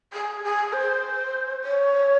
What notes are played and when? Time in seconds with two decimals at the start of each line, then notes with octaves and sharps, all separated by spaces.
0.13 G#4
0.44 G#4
0.73 C5
1.64 C#5